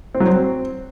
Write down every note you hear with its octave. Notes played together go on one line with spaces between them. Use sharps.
C4
F#3
C4